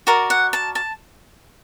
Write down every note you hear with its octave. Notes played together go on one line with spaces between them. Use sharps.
F#4 A#4 D5
F#5
A5
A5